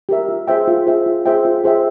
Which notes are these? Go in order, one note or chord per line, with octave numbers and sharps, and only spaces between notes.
G4 A#4 E5
F4
G#4 C5 E5 G5
F4
G#4 C5 E5 G5
F4
G#4 C5 E5 G5
F4
G#4 C5 E5 G5